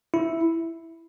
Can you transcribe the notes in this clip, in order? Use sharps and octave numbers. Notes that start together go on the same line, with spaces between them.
E4